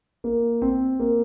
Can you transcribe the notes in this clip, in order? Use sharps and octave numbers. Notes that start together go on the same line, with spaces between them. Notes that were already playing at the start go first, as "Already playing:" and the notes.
A#3
C4
A#3